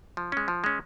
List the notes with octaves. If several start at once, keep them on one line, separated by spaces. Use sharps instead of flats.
F3
G#3 C#4
F3
G#3 C#4